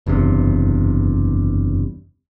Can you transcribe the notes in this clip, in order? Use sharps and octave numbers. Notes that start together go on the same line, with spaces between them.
F#1 E2 G2 C3